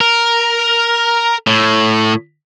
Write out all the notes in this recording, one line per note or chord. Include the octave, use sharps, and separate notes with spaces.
A#4
A2